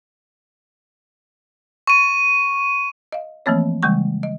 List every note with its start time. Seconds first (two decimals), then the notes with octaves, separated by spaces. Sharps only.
1.87 C#6 D#7
3.12 D#5 F5
3.46 E3 F3 A3 A#3 C4 C#5
3.83 C#3 E3 G3 G#3 C#6
4.23 D#5